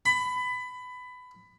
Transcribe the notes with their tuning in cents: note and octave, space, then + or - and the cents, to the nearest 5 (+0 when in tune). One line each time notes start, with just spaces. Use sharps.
B5 +20